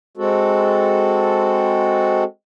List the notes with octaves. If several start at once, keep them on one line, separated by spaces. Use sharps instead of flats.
G#3 C4 F#4 A4